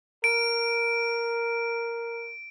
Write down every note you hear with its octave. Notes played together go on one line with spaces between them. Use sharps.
A#4 D7